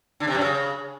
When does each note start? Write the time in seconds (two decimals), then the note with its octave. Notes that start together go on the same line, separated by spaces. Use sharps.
0.20 D3
0.27 C3
0.35 F#2
0.42 C#3